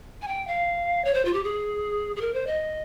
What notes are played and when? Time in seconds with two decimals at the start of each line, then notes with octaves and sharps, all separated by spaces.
0.22 G#5
0.28 G5
0.47 F5
1.05 C#5
1.14 C5
1.25 F4
1.34 G4
1.44 G#4
2.16 G#4
2.21 A#4
2.34 C5
2.47 D#5